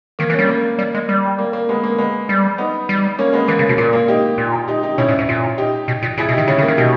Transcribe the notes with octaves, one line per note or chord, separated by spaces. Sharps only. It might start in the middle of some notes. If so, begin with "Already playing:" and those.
D#3 A#3
E3
G3 A#3 C#4
A#3
G3
G#3
G3
A#3
A#3
G#3 B3
A#3
G#3 B3
G3
B3 D#4
G3
A#3 C#4
G#3 B3
E3 A#3
C#3
B2
A#2 A#3
A#3
D#4 G4
A#2
D#4 G4
D#4 G4
B2 C#4 E4
A#2
G#2
A#2
D#4 G4
B2
A#2
A#2 E4 G#4
B2
D#3 D#4 G4
C#3 C#4 E4
C#3
A#3
D#3
B2 D#4 G4